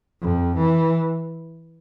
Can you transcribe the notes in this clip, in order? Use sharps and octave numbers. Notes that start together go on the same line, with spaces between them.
F2
E3